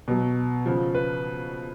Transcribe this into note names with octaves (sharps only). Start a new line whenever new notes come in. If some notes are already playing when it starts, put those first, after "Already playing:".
B2 F#3
C#3 F3
B4